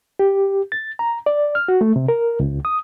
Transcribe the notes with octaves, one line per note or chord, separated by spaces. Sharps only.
G4
A6
A#5
D5
F6
F#4
A3
C3
A#4
C#2
D#6